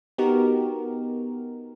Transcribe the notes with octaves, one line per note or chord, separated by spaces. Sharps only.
B3 D#4 F#4 G4 A#4